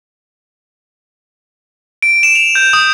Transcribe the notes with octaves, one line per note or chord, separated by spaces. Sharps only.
D7
E7
F7
G6
D#6